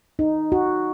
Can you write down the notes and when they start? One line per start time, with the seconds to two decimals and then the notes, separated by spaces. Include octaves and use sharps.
0.19 D#4
0.52 F#4